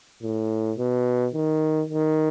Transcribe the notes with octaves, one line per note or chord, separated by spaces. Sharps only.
A2
B2
D#3
D#3